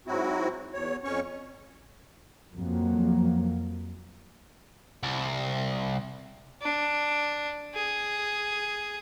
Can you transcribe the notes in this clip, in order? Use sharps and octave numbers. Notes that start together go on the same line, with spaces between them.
G#2 F#3 C4 E4 F#4
E2 C#5
F2 C#4 C#5 C#6
F2 F#3 A#3
C2
D4
G#4